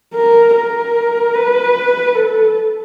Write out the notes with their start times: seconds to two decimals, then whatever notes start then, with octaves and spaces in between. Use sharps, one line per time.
0.15 A#4
0.55 A#4
1.35 B4
2.15 A4